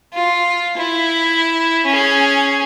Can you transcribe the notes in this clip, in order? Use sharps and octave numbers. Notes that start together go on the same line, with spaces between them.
F4
E4
C#4 G#4